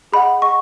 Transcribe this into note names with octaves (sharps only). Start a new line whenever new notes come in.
G#4 D#5 F#5 B5
G#4 D#5 F#5 C#6